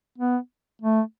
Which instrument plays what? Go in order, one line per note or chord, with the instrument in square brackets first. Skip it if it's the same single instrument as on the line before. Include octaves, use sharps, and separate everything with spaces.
[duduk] B3
A3